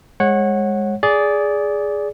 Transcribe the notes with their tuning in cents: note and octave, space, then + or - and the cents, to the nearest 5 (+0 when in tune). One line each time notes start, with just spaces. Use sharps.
G#3 -15 C#5 -25 F#5 +0
G#4 +0 D5 -15